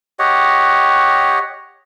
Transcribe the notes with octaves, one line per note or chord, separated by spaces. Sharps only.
G4 C#5 D#5 F#5